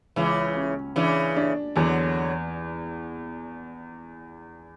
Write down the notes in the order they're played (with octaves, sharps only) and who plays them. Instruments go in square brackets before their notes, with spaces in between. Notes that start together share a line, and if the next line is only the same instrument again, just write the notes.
[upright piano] C#2 [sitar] C#3 E3
[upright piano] C#4
[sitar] C#3 E3 [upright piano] D4
[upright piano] D4
[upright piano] E2 [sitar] D3 F#3